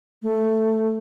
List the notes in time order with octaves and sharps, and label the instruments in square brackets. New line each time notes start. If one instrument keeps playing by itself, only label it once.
[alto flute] A3